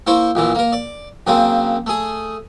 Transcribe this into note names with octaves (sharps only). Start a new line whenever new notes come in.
A#3 E4 C5 C#6
A#1 A#2 E3
A#3 A#4
D5
F#2 C#3 A#3 C4
A3 G#4